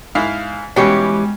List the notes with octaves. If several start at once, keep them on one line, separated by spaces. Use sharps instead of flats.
G#2 E4 F5
B2 E3 G3 G#3 C#4 G4 C#5